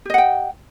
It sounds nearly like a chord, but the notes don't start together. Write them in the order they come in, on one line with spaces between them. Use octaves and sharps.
G4 D#5 F#5 G5